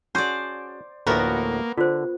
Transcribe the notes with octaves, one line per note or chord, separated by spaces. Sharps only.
C#4 F#4 G#4 C5 D5 F#5 A5
D2 A2 F3 A#3 B3 F#4 A#4
D3 F4 C5